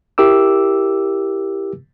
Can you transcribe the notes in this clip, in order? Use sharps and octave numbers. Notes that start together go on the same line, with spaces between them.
E4 G4 A#4 D6 E6